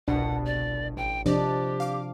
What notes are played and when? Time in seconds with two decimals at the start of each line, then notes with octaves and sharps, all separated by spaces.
0.08 G1 C2 B2 D4 F#5
0.46 D5
0.97 A1 G5
1.26 C3 F3 D4 G4 D5 D#5
1.80 F5 D6